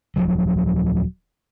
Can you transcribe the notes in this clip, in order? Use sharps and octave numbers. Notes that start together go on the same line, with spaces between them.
D#1 C#2 F3 F#3